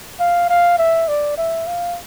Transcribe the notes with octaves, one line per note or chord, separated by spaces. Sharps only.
F5
F5
E5
D5
E5
F5